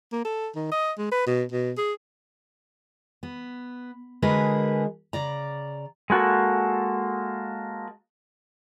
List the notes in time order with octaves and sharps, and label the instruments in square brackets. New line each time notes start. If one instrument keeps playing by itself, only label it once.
[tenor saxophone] A#3
A4
D#3
D#5
G#3
B4
B2
B2
G#4
[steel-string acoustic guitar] B3
D3 G#3 F#4 G#4 A#4 B4
C#3 D5 A#5
[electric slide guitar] G#3 A#3 F#4 A4